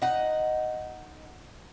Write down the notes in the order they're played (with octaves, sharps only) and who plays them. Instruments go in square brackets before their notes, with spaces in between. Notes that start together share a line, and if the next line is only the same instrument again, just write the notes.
[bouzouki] D#4 F#5